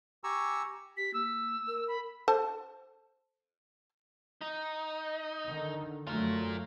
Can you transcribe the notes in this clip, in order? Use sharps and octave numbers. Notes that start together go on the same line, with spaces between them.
G4 G#5 A#5 C#6 E6
G4 B6
A#3 E6
A#4
B5
A4 C5 A5
D#4
D3 D#3
F#2 F#3 A3 F4 A#4